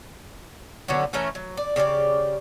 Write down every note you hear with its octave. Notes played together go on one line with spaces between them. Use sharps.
D3 F#3 B3 C#4
E3 A3 C#4 A#4
F#3
D5
C#3 G4 G#4 D5